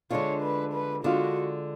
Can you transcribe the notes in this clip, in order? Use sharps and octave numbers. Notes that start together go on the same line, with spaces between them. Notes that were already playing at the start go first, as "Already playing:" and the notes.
D3 G#3 D4 F4 C#5
B4
B4
D3 G#3 D4 F4 F#4